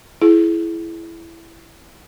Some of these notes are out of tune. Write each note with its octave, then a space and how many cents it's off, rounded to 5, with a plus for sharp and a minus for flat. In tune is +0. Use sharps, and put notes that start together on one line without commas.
E4 +10 G#4 +30